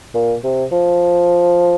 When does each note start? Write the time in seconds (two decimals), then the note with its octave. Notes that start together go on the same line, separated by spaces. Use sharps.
0.15 A#2
0.44 C3
0.72 F3